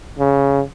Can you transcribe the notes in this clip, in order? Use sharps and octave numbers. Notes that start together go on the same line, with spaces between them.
C#3